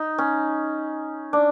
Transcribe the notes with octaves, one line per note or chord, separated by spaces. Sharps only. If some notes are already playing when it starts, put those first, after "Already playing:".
Already playing: D#4
C#4
D4